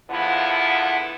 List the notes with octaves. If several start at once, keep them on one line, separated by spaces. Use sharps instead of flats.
E2 D3 F3 B3 E4